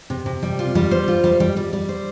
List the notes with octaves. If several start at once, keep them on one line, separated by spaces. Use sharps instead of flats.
C3
C3
G3
F4
G3
C5
F4
G3
G3
G3
G3
C5